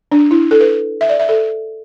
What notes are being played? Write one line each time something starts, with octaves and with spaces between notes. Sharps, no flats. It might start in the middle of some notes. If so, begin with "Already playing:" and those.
D4
E4
A4
B4
E5
D5
E5
A4